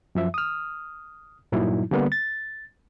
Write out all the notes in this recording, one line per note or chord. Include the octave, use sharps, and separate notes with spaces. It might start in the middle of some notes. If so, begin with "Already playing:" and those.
F#2 F3 E5
D#6 F6
G2 A#2 F#3 D#4 E4
D3 G3 A#3 B3
A6